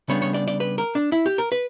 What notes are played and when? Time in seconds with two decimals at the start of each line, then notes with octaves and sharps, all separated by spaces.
0.08 C#3 G3 B3 D4 C#5
0.22 C#5
0.34 D5
0.48 D5
0.60 B4
0.78 A#4
0.95 D4
1.12 E4
1.26 G4
1.38 A#4
1.52 B4